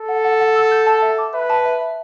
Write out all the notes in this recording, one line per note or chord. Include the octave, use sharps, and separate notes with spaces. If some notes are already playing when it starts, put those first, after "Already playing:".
Already playing: A4
F#5
F#5
F#5
E6
G6
A5
E5
D6
B4 E5
A5
E5
E5